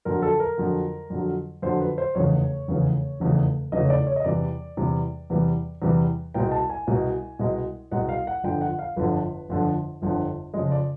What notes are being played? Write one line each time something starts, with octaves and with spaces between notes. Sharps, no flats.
F2 D3 F#3 A#4
A4
A#4
F2 D3 F#3
F2 D3 F#3
F2 D3 F#3 C5
B4
C5
F1 E2 C#3 E3 C#5
F1 E2 C#3 E3
F1 E2 C#3 E3
F1 E2 C#3 E3 D#5
C#5
D5
C#5
D#5
E2 C3 E3 G3 D5
E2 C3 E3 G3
E2 C3 E3 G3
E2 C3 E3 G3
C2 B2 G#3 G5
A5
G#5
C2 B2 G#3
C2 B2 G#3
C2 B2 G#3 F#5
F5
F#5
G1 F2 D3 F3 G5
F#5
F5
G1 F2 D3 F3 B4
G1 F2 D3 F3
G1 F2 D3 F3
F2 C#3 F3 G#3 D#5
D5